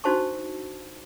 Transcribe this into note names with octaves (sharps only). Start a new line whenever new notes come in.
D4 D#4 F#4 C5 A5 C#6